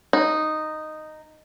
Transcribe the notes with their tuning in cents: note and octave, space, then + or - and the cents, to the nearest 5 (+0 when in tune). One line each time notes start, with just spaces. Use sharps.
D#4 -5